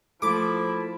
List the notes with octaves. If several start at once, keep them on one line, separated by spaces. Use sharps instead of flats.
F3 A3 A#3 E4 D6